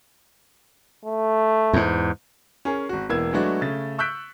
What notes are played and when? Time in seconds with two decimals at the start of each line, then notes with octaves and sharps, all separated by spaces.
1.05 A3
1.73 E2 G#2
2.65 C#4 G#4 A#4
2.89 G#1 F#4
3.10 E1 E3 A#3 E6 G#6
3.33 F#3 G#3 A3 B3 D4 F#4
3.61 C#3 A3 A6
3.99 C#6 E6 F#6 G6 B6 D7